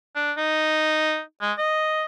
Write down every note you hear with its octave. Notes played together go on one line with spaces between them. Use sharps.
D4
D#4
G#3
D#5